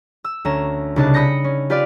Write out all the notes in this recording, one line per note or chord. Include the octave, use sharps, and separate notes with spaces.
E6
D2 C#4 A#5 E7
C2 C#3 D4 D#4 A5 F#6
B5 D#6 G6 A#6 C#7
C#4
F4 G4 B4 D5 F5